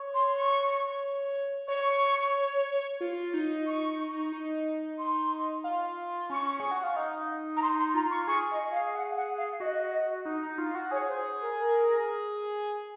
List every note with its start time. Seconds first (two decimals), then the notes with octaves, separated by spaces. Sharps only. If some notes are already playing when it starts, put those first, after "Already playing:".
Already playing: C#5
0.15 C6
0.36 C#6
1.68 C#5 C#6
3.01 F4
3.34 D#4
3.66 C#6
4.32 D#4
4.97 C6
5.64 F4
6.30 C#4 C#6
6.60 G#4
6.71 F#4
6.83 F4
6.96 D#4
7.55 A#5
7.62 D#4 C6
7.78 C6
7.94 F4 A#5
8.11 C#6
8.27 G#4 C#6
8.50 D#5
8.72 F5
8.94 F#5
9.16 F#5
9.38 F5
9.60 F#4 D#5
10.25 D#4
10.43 D#4
10.58 F4
10.75 F#4
10.91 G#4 C#5
11.08 C5
11.41 A#4
11.58 A#4